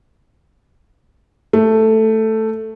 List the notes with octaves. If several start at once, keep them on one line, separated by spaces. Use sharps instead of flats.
A3